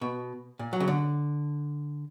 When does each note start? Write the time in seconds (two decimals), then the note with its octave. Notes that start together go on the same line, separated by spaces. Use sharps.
0.01 B2
0.59 A#2
0.73 F#3
0.80 C#3
0.88 D3